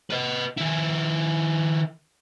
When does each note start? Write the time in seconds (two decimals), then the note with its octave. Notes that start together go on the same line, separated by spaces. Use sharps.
0.11 B4 D#5
0.58 D#3 E4